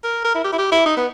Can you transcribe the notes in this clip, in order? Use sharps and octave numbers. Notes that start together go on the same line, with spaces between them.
A#4
A#4
E4
G4
E4
G4
E4
D#4
B3